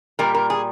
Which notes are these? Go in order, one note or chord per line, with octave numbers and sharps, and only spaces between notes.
A#2 G3 A#4
A#4
G#4